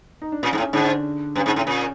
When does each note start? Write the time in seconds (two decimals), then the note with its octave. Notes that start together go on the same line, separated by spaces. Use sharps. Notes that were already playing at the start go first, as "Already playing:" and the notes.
0.22 D#4
0.32 D4
0.43 A#2 C#4
0.53 G#2
0.58 A2 C#4
0.73 G#2 D3 D4
1.35 G2 C#4
1.46 G#2
1.56 A2
1.66 A#2 C#4